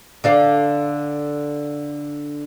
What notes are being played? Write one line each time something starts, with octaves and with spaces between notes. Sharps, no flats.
D3 D5 F5